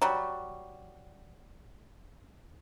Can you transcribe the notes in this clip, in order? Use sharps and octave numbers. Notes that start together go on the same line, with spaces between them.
F#3 G3